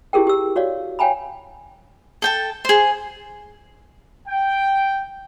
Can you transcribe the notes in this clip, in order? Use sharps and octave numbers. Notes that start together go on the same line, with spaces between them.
E4 G4 G#4 A#4 G5
G4 E6
F#4 C#5 D5 F5
C#5 F5 G5 G#5 A#5 B5
A4 G5 A5
G#4 C5
G5